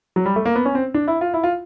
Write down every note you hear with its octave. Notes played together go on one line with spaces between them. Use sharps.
F#3
G3
A3
A#3
B3
C#4
C4
D4
E4
F4
E4
F4